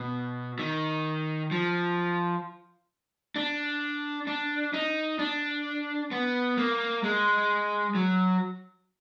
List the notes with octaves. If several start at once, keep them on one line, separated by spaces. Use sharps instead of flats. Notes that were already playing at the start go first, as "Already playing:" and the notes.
Already playing: B2
D#3
F3
D4
D4
D#4
D4
B3
A#3
G#3
F#3